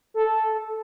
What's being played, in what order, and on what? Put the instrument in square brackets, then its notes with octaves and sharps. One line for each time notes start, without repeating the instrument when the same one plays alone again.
[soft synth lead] A4